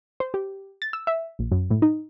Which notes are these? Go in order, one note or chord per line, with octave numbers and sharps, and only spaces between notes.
C5
G4
A6
E6
E5
A#1
F#2
A2
D#4